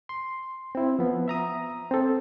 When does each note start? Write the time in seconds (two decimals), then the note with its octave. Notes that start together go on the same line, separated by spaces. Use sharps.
0.09 C6
0.75 C4 E4
0.99 F3 B3
1.28 E5 A#5 D#6
1.91 C4 A4